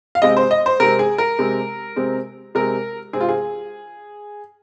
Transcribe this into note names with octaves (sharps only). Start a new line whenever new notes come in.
F5
C3 G#3 C4 D#5
C5
D#5
C5
C3 G#3 C4 A#4
G#4
A#4
C3 G#3 C4
C3 G#3 C4
C3 G#3 C4 A#4
C3 G#3 C4 G#4
F4
G#4